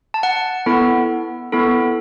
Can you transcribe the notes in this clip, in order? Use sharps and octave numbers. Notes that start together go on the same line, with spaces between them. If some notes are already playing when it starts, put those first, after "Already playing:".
A5
F#5
B3 E4 A4
B3 E4 A4